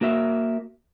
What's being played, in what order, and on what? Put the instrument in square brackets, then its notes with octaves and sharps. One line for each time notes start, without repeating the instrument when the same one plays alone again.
[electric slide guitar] A#3 F#4 A#4 E5